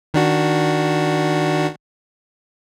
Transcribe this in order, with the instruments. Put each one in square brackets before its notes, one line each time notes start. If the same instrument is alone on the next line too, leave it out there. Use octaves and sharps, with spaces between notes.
[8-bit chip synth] D#3 D4 F#4